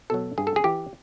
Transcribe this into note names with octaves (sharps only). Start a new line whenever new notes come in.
B2 F#3 A4
G2 G#4
A4
G#4
E3 G4